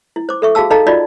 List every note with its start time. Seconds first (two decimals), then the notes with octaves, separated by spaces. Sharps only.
0.16 E4
0.29 C5 D6
0.42 A4 E5 C#6
0.55 F#4 G#4 F5 A5 E6
0.70 D#4 A4 D#5 F5 A5 A#5
0.86 D#4 F4 F#4 D5 D#5